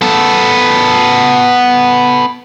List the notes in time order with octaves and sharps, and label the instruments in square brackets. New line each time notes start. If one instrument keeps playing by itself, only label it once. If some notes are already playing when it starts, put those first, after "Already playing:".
[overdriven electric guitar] B3 A4